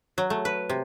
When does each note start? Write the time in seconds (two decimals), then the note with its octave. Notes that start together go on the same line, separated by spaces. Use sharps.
0.18 F#3
0.30 A3
0.45 B4
0.69 C3